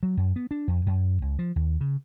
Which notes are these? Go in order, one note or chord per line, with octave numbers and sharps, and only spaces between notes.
F#3
F#2
B3
D4
F2
F#2
C#2
F3
D#2
C#3